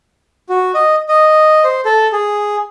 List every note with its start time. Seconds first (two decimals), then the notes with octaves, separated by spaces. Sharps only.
0.49 F#4
0.75 D#5
1.09 D#5
1.64 C5
1.85 A4
2.12 G#4